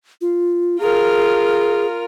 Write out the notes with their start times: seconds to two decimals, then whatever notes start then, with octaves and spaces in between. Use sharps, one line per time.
0.21 F4
0.80 F4 G#4 A#4